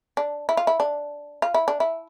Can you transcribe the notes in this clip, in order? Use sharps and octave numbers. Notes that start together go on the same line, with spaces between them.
D4
E4
F4
E4
D4
F4
E4
D4
E4